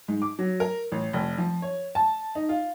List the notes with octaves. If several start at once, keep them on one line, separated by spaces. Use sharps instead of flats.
G#2
D6
F#3
A#4
A1
F1
F3
C#5
A5
D#4
F4